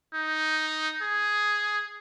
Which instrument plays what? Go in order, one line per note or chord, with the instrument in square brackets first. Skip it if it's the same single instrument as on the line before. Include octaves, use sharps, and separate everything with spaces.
[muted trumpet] D#4
G#4